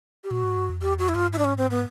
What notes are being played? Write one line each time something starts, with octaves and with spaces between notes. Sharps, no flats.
G4
A#2 F#4
G#2
G2
F2
E2 G4
F2 F#4
E4
G2 F4
G#2 E4
D4
C#4
C4
B3